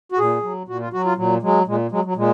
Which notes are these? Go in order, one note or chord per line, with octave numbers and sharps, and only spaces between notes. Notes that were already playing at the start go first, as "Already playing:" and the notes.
F#4
A#2 G#4
F#3
A#2 F#4
F4
F#3 F#4
F4
A#2 F#3
F#3 G#3
A#2 G#3
F#3 G#3
F#3
A#2 G#3